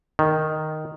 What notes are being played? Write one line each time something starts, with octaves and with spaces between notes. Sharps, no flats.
D#3